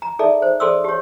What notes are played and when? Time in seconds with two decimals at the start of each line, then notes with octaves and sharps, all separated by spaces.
0.02 A#5
0.19 D#4 G#4 A4 D5 E5
0.42 C5
0.60 G#4 A4 D5 C6 D#6 E6
0.84 G4 C#5